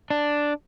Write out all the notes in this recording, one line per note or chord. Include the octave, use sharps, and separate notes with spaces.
D4